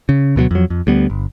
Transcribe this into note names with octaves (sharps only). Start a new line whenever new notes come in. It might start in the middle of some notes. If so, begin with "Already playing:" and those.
C#3
D2 B2 F3 F#3
F2 F#3
F2
D2 G3 B3
G1